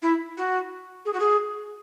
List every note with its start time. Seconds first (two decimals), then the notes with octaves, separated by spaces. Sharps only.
0.02 E4
0.37 F#4
1.05 G#4
1.13 F#4
1.19 G#4